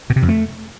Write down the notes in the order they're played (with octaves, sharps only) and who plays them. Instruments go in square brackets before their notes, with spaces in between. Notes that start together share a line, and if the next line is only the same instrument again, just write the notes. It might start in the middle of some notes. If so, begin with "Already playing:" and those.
[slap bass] B2
C3
F2
A3